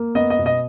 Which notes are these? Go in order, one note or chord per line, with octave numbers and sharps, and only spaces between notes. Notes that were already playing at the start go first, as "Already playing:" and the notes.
Already playing: A#3
B3 D#5
D#5
B2
D#5